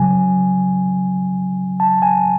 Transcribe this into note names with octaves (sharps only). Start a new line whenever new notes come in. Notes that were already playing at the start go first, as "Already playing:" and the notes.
Already playing: C#3 F#3 G#5
A5
G#5